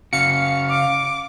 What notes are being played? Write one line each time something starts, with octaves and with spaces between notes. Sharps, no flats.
C#3 F#4 F5 C#7
D6